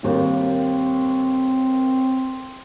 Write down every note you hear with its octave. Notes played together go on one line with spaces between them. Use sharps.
G1 D#2 A#3 C4